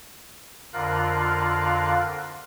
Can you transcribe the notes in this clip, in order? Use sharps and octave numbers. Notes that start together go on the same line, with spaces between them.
F2 D3 F4 A#4 F5 F#6